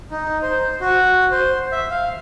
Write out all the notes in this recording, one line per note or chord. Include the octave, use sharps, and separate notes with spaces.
D#4
C5
F#4
C5
E5
F5